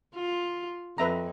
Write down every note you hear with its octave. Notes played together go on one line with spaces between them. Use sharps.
F4
F2 B4 E5 A#5